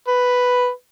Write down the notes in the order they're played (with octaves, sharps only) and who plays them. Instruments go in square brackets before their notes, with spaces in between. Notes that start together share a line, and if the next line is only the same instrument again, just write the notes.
[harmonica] B4